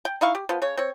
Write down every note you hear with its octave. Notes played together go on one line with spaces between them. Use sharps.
G5
D#4 E4 F5 C#6
G4
F3 B3
C#3 C#5
C4 C#5